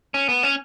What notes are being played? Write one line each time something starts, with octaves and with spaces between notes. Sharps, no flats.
C#4
B3
C#4